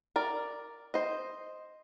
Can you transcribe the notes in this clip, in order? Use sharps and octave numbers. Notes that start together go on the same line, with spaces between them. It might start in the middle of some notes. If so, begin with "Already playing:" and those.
A#4 D5
C5 D#5